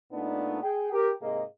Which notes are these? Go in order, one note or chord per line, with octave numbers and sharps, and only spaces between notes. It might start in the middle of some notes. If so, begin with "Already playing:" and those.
A#2 A3 B3 D4 D#4
G#4 G5
G4 A#4
G#2 C3 A#3 G#4 D#5